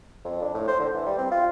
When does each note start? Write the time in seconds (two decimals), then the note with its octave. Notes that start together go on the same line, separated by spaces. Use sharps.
0.25 F2
0.42 D4
0.54 A2
0.67 C5
0.80 D3
0.94 E3
1.06 G3
1.18 C4
1.31 F4